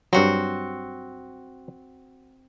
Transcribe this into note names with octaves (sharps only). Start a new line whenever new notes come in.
G2 F#3 C4 F#4